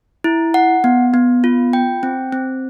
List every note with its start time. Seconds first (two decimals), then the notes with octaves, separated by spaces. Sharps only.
0.24 E4
0.54 F#5
0.84 B3
1.14 B3
1.44 F4
1.73 G5
2.03 C4
2.32 C4